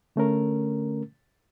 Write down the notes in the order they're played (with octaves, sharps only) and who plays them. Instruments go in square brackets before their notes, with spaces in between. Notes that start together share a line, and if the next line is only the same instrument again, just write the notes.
[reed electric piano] D3 A3 C#4 A#4